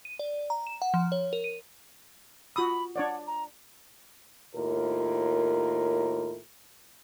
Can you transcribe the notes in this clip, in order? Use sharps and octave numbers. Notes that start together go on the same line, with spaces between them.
D#7
D5
A#5
E7
F#5
F3
C#5
A#4
D#7
F4 F#4 B5 D#6 E6
D4 C#5 D5 F#5
A#5
D#2 A2 F4 A#4